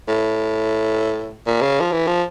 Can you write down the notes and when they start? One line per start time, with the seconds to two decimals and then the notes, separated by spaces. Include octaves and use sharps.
0.08 A2
1.46 A#2
1.62 C#3
1.81 F3
1.92 E3
2.07 F3